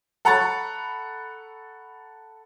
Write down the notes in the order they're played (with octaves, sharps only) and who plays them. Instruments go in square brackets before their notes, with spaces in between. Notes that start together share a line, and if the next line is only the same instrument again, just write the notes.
[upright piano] A4 F#5 A#5 B5 C#6 A6